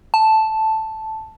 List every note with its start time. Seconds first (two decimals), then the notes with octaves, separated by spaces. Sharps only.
0.14 A5